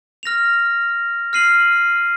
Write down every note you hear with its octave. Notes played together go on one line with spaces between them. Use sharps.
F6 A#6 F7
F6 C7 D#7 F#7